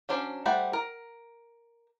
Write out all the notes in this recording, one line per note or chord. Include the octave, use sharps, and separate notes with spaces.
F#3 C#4 D4 C5
G3 A3 C5 F#5
A#4